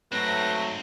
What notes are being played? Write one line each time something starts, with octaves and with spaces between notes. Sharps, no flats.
G#2 F#3 A3 C4 B4 A#6